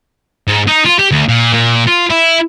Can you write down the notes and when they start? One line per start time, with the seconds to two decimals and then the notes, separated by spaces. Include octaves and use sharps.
0.48 G#2
0.67 D#4
0.85 F4
0.99 G4
1.11 D2
1.28 A#2
1.53 A#2
1.87 F4
2.10 E4